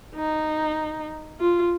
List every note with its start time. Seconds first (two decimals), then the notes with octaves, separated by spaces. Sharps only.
0.15 D#4
1.40 F4